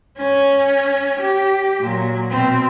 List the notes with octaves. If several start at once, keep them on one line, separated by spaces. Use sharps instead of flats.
C#4 C#5
G4
A#2 F#3
B2 C4